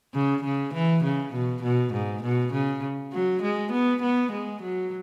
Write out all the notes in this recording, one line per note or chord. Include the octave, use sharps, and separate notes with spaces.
C#3
C#3
E3
C#3
B2
B2
G#2
B2
C#3
F#3
G#3
B3
B3
G#3
F#3